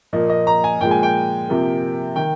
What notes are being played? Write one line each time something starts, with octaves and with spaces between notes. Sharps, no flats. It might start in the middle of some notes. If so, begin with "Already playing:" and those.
A#2 F3 A#3 D#5
D#5
A#5
G#5
A#2 F3 G#3 G5
G#5
G5
C3 F3 A#3
D#3 G5